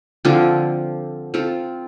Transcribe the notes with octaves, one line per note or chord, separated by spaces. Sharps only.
D3 F3 C4 F4
C4 F4 A4